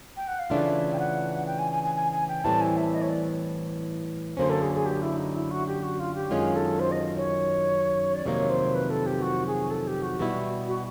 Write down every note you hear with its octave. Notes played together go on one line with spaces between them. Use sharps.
G5
F#5
F5
C#3 E3 A3 D4 F4 E5
G5
F#5
G5
G#5
G#5
G#5
G#5
G#5
G5
A2 E3 G3 C4 E4 A5
G#5
E5
D#5
C#5
D5
F#2 D3 F#3 A#3 C#4 C5
A4
G#4
G#4
G4
E4
D#4
E4
F#4
G4
F#4
F4
G4
F#2 D#3 G#3 C#4 F4 G#4
A4
C5
D#5
C#5
D5
F2 C3 D#3 F#3 A#3 C#5
C5
B4
A4
G4
F#4
G#4
A4
G4
F#4
B2 G3 B3 E4
F#4